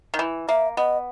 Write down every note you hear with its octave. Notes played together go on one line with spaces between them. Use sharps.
D#3
E3
A#3 E5
B3 D#5